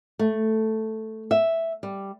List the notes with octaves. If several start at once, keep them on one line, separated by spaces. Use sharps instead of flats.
A3
E5
G3